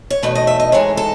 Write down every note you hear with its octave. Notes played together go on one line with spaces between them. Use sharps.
C#5
E2 B2 A3 D#4 B4
D#5
E5
D#5
G#2 E3 G#3 D#4 C#5
A4